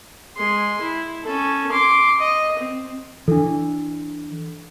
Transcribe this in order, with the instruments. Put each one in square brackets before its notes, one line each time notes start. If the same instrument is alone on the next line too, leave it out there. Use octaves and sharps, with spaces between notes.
[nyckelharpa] G#3 C6
E4
C#4 A4
C6 D6
D#5
C4
[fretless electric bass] E3 [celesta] D4 A4